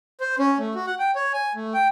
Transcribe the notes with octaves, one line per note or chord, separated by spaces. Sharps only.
C5
C#4
A3
F#4
F#5
G5
C#5
G#5
A3
G5